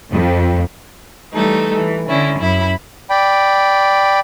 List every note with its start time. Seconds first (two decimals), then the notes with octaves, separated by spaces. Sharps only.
0.11 F2
1.31 E3 G3 A3 D#4 A4
1.74 E3
2.08 D3 C#4 E4
2.38 F#2 E4 B5
3.10 D5 G5 B5